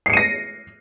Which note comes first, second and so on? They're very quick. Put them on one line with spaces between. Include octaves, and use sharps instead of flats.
C7 C#7 D#7 A#6